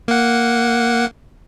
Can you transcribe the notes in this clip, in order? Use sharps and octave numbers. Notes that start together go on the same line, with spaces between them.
A#3 F#5